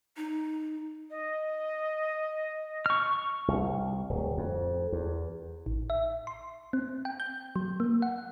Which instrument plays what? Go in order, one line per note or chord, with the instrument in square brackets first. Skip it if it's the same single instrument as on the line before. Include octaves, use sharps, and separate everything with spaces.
[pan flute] D#4
[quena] D#5
[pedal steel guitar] C#6 F6
[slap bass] C2
D1
F2
E2
[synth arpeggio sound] A1
E5
C6
C4
G5
G6
F#3
A#3
F#5